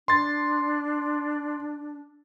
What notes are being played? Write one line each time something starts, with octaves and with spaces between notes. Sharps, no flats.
D4 C6 A6